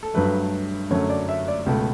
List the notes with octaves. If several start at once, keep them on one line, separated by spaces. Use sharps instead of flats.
A4
G2 F#3 A3 B4
F#2 D3 F#3 A3 C#5
D5
E5
D5
C#2 B2 A3